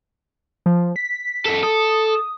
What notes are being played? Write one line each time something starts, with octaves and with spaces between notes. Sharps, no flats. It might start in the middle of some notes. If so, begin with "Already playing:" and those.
F3
B6
F#2 A4
A4 D#6